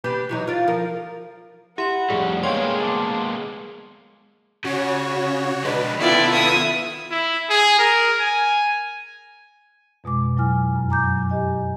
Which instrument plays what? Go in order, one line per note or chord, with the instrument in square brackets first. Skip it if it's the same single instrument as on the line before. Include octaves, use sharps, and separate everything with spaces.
[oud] D4 G4 B4
E3 F#3 D#4
F4 D5
F3 A#4
[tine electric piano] E4 [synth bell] G4 B5 [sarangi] F#5
[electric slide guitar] F2 A2 A3 [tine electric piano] G3 [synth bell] G#4
[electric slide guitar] G#3 A#3 B3 [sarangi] G#4 [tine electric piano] C#5 F5 G5 [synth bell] C6
[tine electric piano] A5 D6
[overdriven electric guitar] C#3 [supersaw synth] F#4 C#5
[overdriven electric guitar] G#3 D4 [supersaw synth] B4
[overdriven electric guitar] D#3 A4 [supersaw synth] B3 F4 [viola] E4 [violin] D5 G5
[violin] E5 D#6
[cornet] E4
G#4
A#4
G#5
[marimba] F2 B2 G#3 D6
F#3 E4 G#5 F6
F#2
G#5 A#5 D6 G6
F#3
G4 D#5 G#5